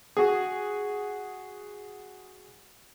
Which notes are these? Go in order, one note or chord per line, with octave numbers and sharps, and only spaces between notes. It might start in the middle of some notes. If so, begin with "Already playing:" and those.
F#4 G#4